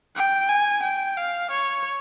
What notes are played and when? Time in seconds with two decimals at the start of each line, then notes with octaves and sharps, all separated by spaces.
0.16 G5
0.49 G#5
0.83 G5
1.17 F5
1.51 C#5